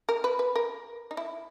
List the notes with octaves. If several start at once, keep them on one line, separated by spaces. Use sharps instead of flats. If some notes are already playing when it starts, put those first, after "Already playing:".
A#4
B4
B4
A#4
D#4
E4